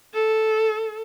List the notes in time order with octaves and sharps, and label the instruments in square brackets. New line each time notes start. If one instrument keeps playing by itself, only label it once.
[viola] A4